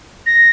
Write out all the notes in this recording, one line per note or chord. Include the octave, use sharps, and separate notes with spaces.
A#6